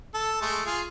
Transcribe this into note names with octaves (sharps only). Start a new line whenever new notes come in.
A4
G#3 A3
F4 G#4